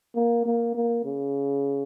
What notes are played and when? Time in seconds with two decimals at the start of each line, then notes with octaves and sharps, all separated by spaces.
0.15 A#3
0.46 A#3
0.75 A#3
1.05 C#3